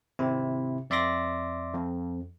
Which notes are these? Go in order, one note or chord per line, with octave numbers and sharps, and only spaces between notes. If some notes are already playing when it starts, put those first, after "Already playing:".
G#1 C3 C4 E4
F2 D5 E5 C6 D6 A#6
F2